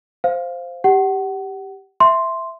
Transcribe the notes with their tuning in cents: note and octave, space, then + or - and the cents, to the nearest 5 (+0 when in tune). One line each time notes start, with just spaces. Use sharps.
C5 +0 F5 +0
G4 +0 F#5 +30
E5 +0 C6 +0